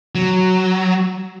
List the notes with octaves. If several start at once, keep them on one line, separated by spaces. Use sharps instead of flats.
F#3